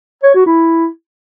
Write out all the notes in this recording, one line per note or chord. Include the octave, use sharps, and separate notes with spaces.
C#5
F#4
E4